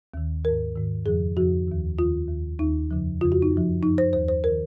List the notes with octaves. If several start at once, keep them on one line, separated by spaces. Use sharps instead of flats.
D#2 D#3
G#2 D#3 A#4
G#2 D#3
F2 C#3 F3 G#4
F2 C#3 F3 F#4
D#2 D#3
D#2 D#3 F4
D#2 D#3
D#2 D#3 D#4
F2 C#3 F3
F2 C#3 F3 F4
F#4
D#4
F#2
F3
F#2 F3 D#4
C5
D#2 D#3 C5
C5
A#4
D#3